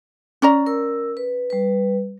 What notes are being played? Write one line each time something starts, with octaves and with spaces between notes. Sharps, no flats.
C#4 D5 A#5
A#4 E6
B4
G3 B4